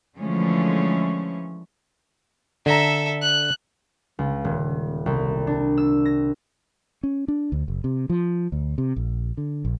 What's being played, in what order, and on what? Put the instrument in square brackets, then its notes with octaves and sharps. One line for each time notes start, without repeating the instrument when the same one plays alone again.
[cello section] D3 E3 F3 G#3 A3 C#4
[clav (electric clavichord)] D3 A#5 [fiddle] A4 E5
[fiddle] F#6
[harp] C#2
D#1
C2
D4
E6
A#6
[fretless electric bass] C#4
D4
D2
F#1
C3
F3
D2
C3
A#1
D3
A#1